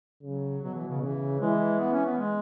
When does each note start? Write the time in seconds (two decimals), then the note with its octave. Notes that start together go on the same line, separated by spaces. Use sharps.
0.23 C#3 F#3
0.62 B2 F#3
0.75 E3
0.88 C#3
1.02 C#3 E3
1.41 E3 G#3
1.80 B3
1.92 C#4
2.06 B3
2.19 G#3